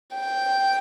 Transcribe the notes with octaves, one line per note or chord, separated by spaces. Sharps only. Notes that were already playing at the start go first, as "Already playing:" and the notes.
G5